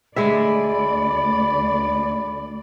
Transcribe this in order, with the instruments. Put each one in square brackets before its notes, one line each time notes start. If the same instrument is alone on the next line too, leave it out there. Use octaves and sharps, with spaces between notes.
[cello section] D2 D5 [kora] G#3 G#4 E5 [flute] B5